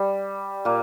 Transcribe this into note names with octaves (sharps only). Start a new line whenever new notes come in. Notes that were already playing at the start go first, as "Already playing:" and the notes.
Already playing: G3
A#2 A#3